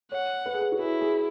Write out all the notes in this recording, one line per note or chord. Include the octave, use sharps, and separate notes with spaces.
C#5 F#5
B4
G#4
B4
F#4
E4 G#4
G#4